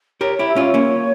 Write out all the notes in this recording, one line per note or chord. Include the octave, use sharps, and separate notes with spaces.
G4 A#4 C#5
E4 G4 C#5
E5
C#4 F4 C#5
A#3 C#4